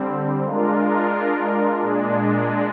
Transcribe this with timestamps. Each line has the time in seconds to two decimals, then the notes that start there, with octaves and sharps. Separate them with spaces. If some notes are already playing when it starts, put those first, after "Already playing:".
Already playing: D3 G3 C4
0.42 G#3 D4 F4 A#4
1.81 A#2 G#3 D4